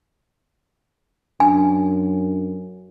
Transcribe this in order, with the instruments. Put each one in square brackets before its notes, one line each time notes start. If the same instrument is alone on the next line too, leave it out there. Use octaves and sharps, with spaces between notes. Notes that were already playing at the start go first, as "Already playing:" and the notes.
[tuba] F#2 [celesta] D4 [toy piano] G#5